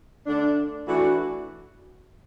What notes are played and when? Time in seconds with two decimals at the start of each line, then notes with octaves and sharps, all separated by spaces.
0.26 D3 A3 D4
0.87 E3 A3 D4 F#4